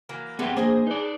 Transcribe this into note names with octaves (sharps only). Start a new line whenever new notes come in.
E3 F#3 A#3
A3 B3 C4 G4 G#4 B4 F#5
A#3 D4 G#4 C5 D#5 G#5
D#4 B4 D5